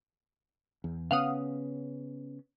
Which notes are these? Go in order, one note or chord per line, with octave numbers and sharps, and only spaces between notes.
E2
C#3 B3 C#4 F5 F#5 D#6